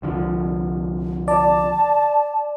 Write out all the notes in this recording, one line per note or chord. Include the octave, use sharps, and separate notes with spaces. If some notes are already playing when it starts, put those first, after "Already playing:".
C2 D3 F3
D5 A5